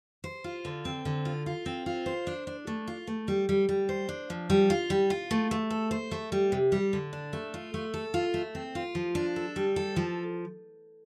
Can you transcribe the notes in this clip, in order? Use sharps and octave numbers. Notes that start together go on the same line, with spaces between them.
C5
F4
D3
C4
D3
F4
F4
C4
F4
C5
D4
D4
A3
F4
A3
G3
G3
G3
C5
D4
F3
G3
F4
G3
F4
A3
A3
A4
C5
A3
G3
C3
G3
D3
D4
A3
F4
A3
A4
F4
A3
C4
F4
F3
D4
A4
G3
A4
F3